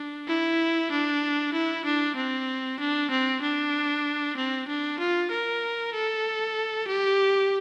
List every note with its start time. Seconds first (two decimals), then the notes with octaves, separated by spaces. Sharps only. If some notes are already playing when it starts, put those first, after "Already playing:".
Already playing: D4
0.28 E4
0.91 D4
1.53 E4
1.85 D4
2.16 C4
2.79 D4
3.10 C4
3.42 D4
4.36 C4
4.68 D4
4.99 F4
5.31 A#4
5.94 A4
6.87 G4